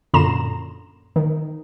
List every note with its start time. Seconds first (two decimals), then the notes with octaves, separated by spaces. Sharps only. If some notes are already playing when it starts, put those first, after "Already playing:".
0.14 F#2 A#2 D3 A#5 C6 E7
1.16 D#3